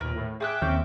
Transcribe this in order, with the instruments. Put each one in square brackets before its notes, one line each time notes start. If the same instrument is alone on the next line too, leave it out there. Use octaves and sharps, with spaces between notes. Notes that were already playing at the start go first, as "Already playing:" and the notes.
[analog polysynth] D#2 A#2 [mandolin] A#4 B4
[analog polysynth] A2
[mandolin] G#4 D#6 F#6 [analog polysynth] E5 G5 D6
[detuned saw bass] D#2 [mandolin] C4 C#4 G6